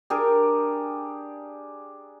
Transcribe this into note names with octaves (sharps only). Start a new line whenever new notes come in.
D4 G4 G#4 A#4